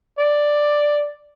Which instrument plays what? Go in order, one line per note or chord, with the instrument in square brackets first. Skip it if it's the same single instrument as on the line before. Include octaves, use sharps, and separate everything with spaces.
[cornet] D5